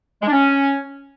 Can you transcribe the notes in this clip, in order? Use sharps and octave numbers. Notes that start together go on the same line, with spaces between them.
G#3
D4
C#4